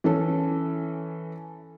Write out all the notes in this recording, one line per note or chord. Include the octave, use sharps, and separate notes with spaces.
E3 C#4 A4